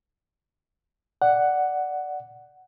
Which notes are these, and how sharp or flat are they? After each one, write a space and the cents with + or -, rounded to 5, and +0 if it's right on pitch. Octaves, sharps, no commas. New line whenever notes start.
D5 +0 F#5 +5